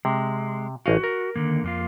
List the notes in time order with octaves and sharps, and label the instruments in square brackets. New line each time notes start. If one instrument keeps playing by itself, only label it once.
[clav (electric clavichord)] C3 [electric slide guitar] G#3
[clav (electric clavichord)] A1 D#5 F5 [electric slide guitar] F#4
[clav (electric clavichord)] A#4
[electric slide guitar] D3 D#3 A#3
F2 A#3 F4